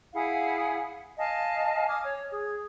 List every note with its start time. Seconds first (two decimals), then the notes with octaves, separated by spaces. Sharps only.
0.13 E4 G#4 F5 F#5
1.19 D#5 F5 G#5 A5
1.87 G#5 D6 D#6 F6
2.05 C#5
2.31 G#4